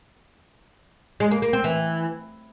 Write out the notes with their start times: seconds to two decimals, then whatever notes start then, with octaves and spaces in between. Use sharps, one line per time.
1.20 G#3
1.31 A#3
1.42 A#3
1.53 C4
1.64 E3